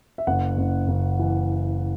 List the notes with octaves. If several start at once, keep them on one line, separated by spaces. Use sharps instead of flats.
E5
F#1 F#5
F#1
F#1
E3